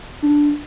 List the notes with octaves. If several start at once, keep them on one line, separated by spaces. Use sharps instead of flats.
D4